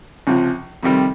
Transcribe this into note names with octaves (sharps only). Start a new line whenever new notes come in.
C#2 C3 F3
F2 C3 D#3 G3